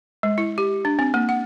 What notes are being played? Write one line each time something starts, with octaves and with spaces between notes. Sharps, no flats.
G#3
E4
G4
D4
C4
A#3
F#5